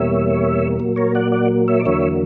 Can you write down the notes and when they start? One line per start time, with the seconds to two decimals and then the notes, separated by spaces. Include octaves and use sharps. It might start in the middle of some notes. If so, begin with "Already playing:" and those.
Already playing: E2 B2 G3 A#3 C#5 E5
0.80 A#2 F#3 A#3
0.96 A#4 C#5
1.15 D5 F#5
1.32 D5 F#5
1.68 C#5 E5
1.80 D5
1.85 E2 D3 F#3 A#3 C#5 E5